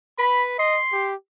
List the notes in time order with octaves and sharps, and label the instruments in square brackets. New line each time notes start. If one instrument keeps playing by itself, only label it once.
[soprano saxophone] B4 [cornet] B5
[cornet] D#5 [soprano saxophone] C6
[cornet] G4